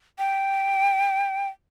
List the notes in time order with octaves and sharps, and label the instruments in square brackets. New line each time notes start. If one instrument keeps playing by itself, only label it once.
[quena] G5